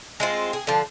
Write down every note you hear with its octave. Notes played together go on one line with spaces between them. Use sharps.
G#3 C4 F4
G#4
D3 F3